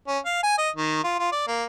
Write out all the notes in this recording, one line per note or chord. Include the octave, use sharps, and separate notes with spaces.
C#4
F5
G#5
D#5
D#3
F4
F4
D5
A#3